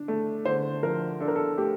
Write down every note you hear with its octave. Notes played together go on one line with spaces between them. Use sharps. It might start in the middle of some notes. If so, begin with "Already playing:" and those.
Already playing: D4
A3
D3 C5
F3 A#4
D4 A4
A#4
A4
A3 G4